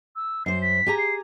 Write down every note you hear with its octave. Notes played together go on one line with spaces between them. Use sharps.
E6
F#2 C5 C7
B6
G4 G#4 A#5
C7